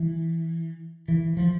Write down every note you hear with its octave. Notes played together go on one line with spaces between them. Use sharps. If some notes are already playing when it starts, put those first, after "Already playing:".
Already playing: E3
E3
F3